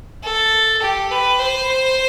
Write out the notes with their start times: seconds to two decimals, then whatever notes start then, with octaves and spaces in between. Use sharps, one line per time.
0.23 A4
0.82 G4
1.11 B4
1.39 C5